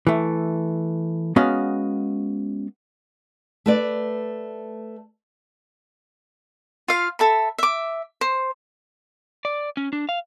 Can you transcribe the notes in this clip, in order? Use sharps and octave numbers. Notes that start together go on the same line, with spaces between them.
E3 A3
G#3 B3 C#4 F#4 D#5 F5
A3 B4 D5
F4 F5
A4 E5 B5
E5 D6
C5
D5
C#4
D4
F5